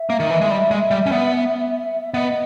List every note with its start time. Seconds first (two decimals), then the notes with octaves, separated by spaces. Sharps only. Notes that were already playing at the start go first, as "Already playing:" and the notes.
Already playing: E5
0.10 A#3
0.20 D#3
0.30 E3
0.41 G#3
0.51 G3
0.71 G#3
0.91 G3
1.06 C#4
1.12 B3
2.14 B3 D#5